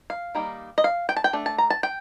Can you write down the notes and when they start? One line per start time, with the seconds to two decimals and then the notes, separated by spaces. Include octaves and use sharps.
0.10 F5
0.35 D#3 G3 A#3 D#4
0.78 D#5
0.84 F5
1.09 G5
1.17 A5
1.24 G5
1.33 A3 D4
1.46 A5
1.58 A#5
1.70 A5
1.83 G5